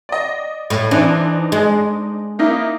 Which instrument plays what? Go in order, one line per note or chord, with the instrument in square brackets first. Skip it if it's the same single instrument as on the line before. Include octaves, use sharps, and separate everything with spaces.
[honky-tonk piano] D5 D#5
[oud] A2
[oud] E3 [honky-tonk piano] D4 D#4 C5
[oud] G#3
[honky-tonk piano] A#3 D#4 E4